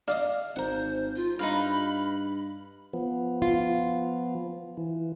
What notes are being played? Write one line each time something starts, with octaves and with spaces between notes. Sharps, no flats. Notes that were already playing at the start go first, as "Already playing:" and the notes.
D4 D5 D#5 F5
G#1 A#4 C5 F#5
F4
G2 D#4 B4 F5 B5
F3 B3
F4
E3